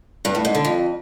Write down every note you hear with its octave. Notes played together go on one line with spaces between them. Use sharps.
G2
A2
G#2
D3
F2